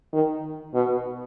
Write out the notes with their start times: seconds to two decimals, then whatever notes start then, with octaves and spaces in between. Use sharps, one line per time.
0.13 D#3
0.74 B2